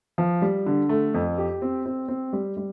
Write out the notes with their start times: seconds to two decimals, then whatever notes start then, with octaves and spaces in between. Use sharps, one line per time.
0.18 F3
0.42 G3
0.66 D3
0.89 A3
1.14 F2
1.38 G4
1.62 C4
1.86 C4
2.08 C4
2.33 G3
2.57 G3